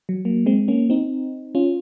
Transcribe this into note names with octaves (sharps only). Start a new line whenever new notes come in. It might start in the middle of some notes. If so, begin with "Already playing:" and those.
F#3
F#3 A#3
G#3 C4
A#3 C#4
C4 D#4
C#4 F4